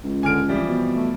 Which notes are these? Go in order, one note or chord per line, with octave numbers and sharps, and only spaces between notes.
C#2
D3 G#5 F6 D7
E3 F3 G3 C4
B2
A3